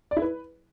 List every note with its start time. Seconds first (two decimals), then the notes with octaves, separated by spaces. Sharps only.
0.11 D5
0.17 E4
0.22 B4